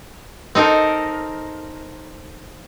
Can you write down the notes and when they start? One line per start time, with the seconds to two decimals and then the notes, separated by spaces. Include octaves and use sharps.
0.55 C4 D#4 A4 A#4